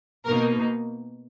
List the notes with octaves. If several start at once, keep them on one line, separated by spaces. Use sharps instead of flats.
B2 A#3 D#4 A#4